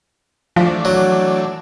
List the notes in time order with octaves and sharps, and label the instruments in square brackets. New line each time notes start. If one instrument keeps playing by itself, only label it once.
[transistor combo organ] E3 A3 D4 [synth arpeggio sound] F3
[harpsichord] F#3